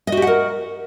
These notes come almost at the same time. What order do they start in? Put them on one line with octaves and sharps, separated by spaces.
D#5 F#4 G4 F#5 A#4